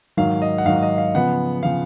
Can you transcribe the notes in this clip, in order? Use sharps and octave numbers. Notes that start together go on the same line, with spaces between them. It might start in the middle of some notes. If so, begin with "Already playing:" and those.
G#2 D#3 F#3 F5
D#5
F#5
G#2 D#3 F#3 F5
D#5
F5
C#3 F3 B3 F#5
C#3 F3 B3 F5